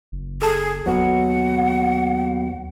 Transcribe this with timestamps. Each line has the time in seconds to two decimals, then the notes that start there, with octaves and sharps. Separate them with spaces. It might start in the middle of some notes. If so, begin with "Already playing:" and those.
0.12 F#1
0.42 G#4 A4 A5
0.86 D#2 F#3 B3 F#4 F#5